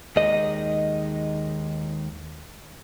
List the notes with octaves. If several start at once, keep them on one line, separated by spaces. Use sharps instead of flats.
D#2 D#3 G#3 D#4 D#5